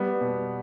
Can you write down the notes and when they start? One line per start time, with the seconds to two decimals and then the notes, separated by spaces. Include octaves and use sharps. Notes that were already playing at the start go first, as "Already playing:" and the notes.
Already playing: G3 B3
0.21 B2